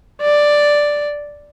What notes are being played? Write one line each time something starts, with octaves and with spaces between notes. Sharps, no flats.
D5